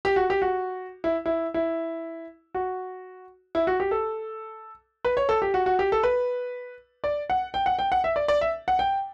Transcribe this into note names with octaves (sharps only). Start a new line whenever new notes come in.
G4
F#4
G4
F#4
E4
E4
E4
F#4
E4
F#4
G4
A4
B4
C#5
A4
G4
F#4
F#4
G4
A4
B4
D5
F#5
G5
F#5
G5
F#5
E5
D5
D5
E5
F#5
G5